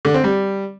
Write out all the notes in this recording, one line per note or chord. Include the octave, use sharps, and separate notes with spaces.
D3
C4
G3